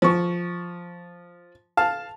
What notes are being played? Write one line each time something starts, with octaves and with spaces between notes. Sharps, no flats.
F3 C#6
F5 A5